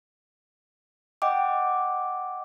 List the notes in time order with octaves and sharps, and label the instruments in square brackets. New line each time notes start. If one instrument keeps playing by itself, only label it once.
[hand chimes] D#5 F#5 G5 D6